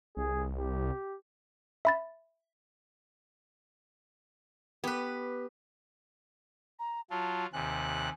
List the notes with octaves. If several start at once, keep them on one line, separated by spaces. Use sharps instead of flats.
C2 G#4
G4
E5 B5 A6
B3 G4 B4
A#5
F#3 F4 A5
D#2 C3 G#5 F#6